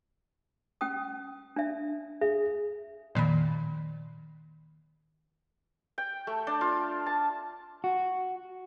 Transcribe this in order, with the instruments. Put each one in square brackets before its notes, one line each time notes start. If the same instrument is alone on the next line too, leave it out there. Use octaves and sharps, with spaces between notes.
[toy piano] C#4 G5 D#6
D4 E5
[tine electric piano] G#4 [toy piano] E5
[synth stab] F2 A#2 [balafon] D#3 B5
[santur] G5
A3
D4
F4
A5
[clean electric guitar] F#4